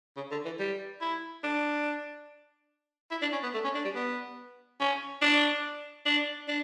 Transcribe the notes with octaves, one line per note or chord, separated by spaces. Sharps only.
C#3
D3
E3
G3
E4
D4
E4
D4
C#4
B3
A3
C#4
D4
G3
B3
C#4
D4
D4
D4